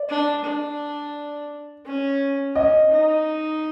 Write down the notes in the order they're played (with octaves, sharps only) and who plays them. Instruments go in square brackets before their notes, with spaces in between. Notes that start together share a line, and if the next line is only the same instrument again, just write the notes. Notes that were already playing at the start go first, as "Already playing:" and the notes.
Already playing: [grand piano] D5
[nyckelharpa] D4
D4
C#4
[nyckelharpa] C#4 [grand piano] D#5
[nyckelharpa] D#4